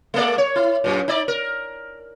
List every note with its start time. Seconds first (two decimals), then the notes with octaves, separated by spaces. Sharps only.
0.14 G#3 A#3 D5
0.38 C#5
0.56 E4
0.84 F#2 A#2
1.08 D#4 D5
1.28 A#4